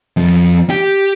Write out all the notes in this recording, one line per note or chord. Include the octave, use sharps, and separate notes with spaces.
F2
G4